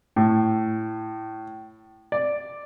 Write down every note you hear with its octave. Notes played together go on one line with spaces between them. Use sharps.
A2
D5